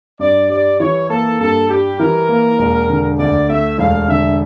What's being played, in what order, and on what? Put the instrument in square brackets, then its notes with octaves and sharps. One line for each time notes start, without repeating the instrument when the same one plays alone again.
[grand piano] G2 [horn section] D5
[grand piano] G3 [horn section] D5
[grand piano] E3 [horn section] C#5
[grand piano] A#3 [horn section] A4
[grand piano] G2 [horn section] A4
[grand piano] G3 [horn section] G4
[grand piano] E3 [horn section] A#4
[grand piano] A#3
E1
D3
[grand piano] D2 [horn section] D5
[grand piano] A3 [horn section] E5
[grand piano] E1 [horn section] F5
[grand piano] D3 [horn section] E5